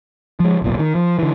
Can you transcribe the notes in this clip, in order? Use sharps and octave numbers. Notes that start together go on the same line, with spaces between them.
F3 G#3
D1 B1 A#2
D#3
F3
D3 E3